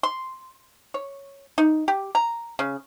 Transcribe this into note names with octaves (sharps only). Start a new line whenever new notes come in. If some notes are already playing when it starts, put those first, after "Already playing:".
C6
C#5
D#4
G4
A#5
C#3